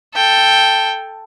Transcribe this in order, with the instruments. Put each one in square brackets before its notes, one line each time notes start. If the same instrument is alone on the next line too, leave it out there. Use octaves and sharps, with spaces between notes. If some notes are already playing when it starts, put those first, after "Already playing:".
[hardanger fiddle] A4 G5